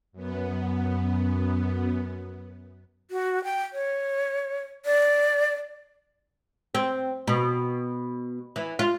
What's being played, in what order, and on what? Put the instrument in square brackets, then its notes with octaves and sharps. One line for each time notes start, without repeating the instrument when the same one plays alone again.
[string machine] F#2 B3
[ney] F#4
G5
C#5
D5
[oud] C4
B2
E3
F4